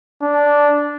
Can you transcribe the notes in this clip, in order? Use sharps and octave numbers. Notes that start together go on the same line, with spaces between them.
D4